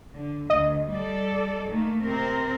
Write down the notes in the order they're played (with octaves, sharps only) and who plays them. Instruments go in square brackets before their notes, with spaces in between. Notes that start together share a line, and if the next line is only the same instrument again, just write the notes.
[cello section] D3
[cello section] D2 [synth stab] D#5
[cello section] G3 A4 D5
D#3 A3 A#3
C3 C4 A#4